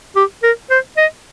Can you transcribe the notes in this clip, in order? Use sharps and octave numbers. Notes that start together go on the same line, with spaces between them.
G4
A#4
C5
D#5